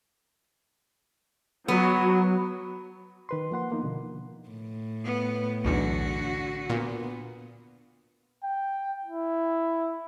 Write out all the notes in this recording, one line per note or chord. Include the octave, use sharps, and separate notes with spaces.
F#3 B3
D#3 B4 C6
F3 A#3 F#5 C6
A#3 B3 D#4
B2 D3 F3
A2
B3
B1 E2 D3 F#4
A#2 B3
G5
E4